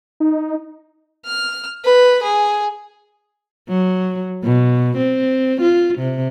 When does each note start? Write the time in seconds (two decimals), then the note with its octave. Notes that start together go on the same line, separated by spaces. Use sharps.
0.20 D#4
1.25 F6
1.84 B4
2.22 G#4
3.69 F#3
4.44 B2
4.97 C4
5.61 F4
5.98 C3